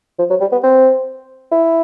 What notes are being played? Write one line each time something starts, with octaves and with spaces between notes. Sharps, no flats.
F3
F#3
G3
B3
C4
E4